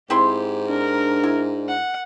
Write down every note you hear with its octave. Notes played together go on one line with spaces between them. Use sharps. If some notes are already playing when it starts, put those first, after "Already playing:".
G#2 C4 E4 G4 C6
D4 A#4
E4
F#5